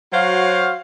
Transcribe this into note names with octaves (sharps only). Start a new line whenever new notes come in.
F#3 F#4 C5 F5